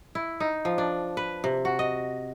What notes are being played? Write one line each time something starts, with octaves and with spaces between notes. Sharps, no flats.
E4
D#4
F3
D4
B4
C3
F#4
D#5